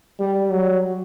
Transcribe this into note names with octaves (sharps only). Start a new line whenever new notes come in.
G3
F#3